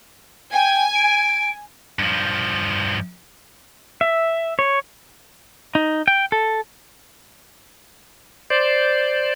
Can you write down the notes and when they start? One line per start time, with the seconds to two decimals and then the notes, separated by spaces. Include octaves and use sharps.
0.54 G5 G#5
0.95 D7
1.99 G2 F3
4.01 E5
4.59 C#5
5.75 D#4
6.08 G5
6.32 A4
8.50 C5 D5